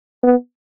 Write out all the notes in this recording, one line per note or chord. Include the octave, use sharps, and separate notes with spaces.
B3